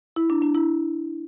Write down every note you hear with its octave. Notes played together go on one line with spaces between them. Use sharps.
E4
D4
D4
E4